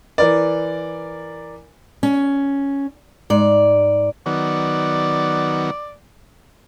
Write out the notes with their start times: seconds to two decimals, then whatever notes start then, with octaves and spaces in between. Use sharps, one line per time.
0.18 E3 A#4 D5
2.03 C#4
3.30 G#2 D5
4.26 D#3 F#3 B3 D5